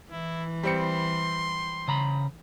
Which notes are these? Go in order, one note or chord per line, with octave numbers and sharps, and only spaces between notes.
E3 E4
G3 C4 C6 C#7
C#3 A#5 B5